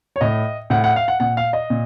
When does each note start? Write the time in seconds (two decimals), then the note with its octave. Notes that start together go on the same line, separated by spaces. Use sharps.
0.16 C#5
0.21 A2 D#5
0.70 A2 F#5
0.84 F#5
0.96 F5
1.08 F#5
1.20 A#2 F#5
1.37 F5
1.53 D#5
1.70 A#2